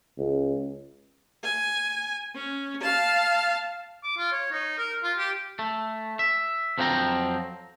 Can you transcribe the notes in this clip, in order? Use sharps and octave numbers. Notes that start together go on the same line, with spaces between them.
C#2
G#5
C#4
F5 A5
D6
F4
C#5
D#4
A#4
F4
G4
A3
E5
F2 F3 F#3 C4 G5 A#5